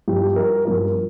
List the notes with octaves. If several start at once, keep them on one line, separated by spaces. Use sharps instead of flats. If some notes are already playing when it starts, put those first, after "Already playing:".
G2 F3 G4
A#4
G2 F3 A#4